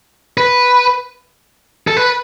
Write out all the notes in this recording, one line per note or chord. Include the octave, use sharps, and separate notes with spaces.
B4
A4
B4